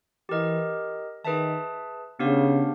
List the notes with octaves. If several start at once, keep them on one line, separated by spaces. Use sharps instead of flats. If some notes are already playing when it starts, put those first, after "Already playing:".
E3 G4 A#4 D#5
D#3 G#4 B4 E5 A5
C#3 B3 D4 G4 C5 F5